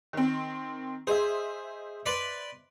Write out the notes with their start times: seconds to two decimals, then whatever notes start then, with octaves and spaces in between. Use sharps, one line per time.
0.13 D#3 C4
1.07 G#4 C5 D#5 E5
2.06 B4 D5 C6